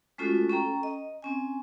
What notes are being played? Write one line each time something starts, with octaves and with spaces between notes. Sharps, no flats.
G#3 A3 C#4 F4 F#4 A4
C#4 A4 G5 A#5
D#5
C4 C#4 G#5